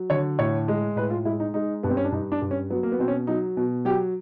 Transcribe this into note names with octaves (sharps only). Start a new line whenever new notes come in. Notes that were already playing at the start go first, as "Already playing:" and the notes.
Already playing: F#3
D3 C#5
A2 C#5
G#3
A2 B4
F4
G#3 E4
D#4
G#3 D#4
G2 B3
C4
C#4
D4
G2 D#4
D4
G2
C#4
F#3 B3
A#3
B3
B2 C4
C#4
F#3 D#4
B2
F#3 G4